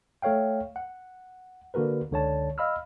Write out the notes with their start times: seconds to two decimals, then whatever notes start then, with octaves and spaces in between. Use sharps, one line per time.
0.22 A3 A4 C#5 F5 G5
0.76 F#5
1.74 D3 A#3 F#4 A#4 B4
2.11 C#2 D3 C#5 A5
2.58 D#5 F5 B5 E6 F6